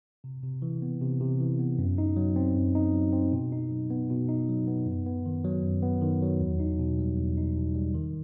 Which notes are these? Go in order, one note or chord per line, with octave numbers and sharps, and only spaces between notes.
C3
C3
E3
B3
C3
C3
E3
B3
F#2
D#4
F#3
C4
F#2
D#4
F#3
C4
B2
D#4
F#3
B3
B2
D#4
F#3
B3
F#2
B3
D#3
F#3
F#2
B3
D#3
F#3
E2
D#4
B2
G3
E2
D#4
B2
G3
D#3